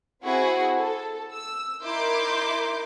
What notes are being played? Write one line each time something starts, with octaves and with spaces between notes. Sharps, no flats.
C4 E4 F#4 G#4
A4
E6
D#4 E4 A#4 C6 D6 G6